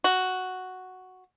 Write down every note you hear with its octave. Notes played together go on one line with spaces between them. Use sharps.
F#4